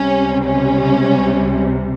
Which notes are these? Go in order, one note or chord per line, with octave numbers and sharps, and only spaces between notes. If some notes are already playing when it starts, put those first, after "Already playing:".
Already playing: C#2 C3 G3 C#4
C#4